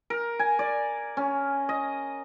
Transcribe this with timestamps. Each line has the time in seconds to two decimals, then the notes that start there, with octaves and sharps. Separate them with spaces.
0.10 A#4
0.39 G#5
0.59 D5
1.17 C#4
1.69 D#5